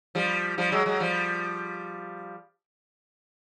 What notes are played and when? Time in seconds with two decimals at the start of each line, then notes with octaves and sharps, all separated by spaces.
0.15 F3 G3
0.58 F3 G3
0.72 F#3 G#3
0.86 F#3 G#3
1.00 F3 G3